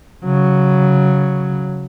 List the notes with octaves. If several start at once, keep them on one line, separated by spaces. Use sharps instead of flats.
C#3 F#3